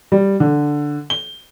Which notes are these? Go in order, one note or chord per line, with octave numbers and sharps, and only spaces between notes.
G3
D3
G7